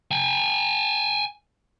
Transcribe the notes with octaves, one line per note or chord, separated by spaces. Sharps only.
G5 G#5